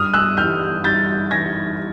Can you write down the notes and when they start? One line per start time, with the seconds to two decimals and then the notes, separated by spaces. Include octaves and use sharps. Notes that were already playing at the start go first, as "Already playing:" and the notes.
Already playing: G2 D#6 F6
0.14 E6 F#6
0.37 E3 G3 F6 G6
0.84 G2 G6 A6
1.31 E3 G3 G#6 A#6